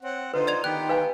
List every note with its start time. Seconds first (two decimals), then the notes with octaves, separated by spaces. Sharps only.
0.03 C4 C#5 F#5
0.34 D3 D#4 F4 B4 C5
0.47 D5 G#6 F7
0.64 D#3 B3 G4 G5 F#6
0.89 B4 F5 G#5